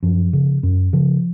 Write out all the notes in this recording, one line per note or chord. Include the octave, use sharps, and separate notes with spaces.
F#2 F3
C#3
F#2
C#3 F3